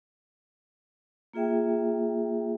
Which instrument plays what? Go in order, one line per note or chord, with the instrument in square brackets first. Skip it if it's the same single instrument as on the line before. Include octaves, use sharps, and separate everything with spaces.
[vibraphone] A#3 F4 G#4 E5 G5